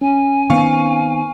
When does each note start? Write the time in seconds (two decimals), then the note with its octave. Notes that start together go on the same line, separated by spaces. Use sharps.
0.01 C#4 G#5
0.50 D#3 B3 C4 F5 C#6